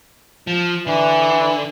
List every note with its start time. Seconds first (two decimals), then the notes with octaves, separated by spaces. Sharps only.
0.47 F3
0.87 D3 E3